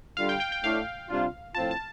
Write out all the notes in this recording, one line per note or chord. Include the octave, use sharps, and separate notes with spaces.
D3 G3 F4 F5
G5
G5
G5
A2 A3 D4 F5
C3 G3 D4 F4
A2 F3 C4 F4 A5
A5